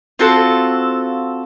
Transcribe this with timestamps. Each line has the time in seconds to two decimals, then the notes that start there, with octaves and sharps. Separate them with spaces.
0.19 C4 F4 F#4 A4